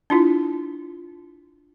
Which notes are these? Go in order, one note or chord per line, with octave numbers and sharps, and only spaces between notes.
D4 E4 F4